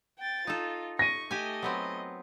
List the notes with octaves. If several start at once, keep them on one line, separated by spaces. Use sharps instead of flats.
G5 A6
D#4 F4 A4
C#6 A#6 D#7
A3 G4 D#5 G#5
F#3 B3 C4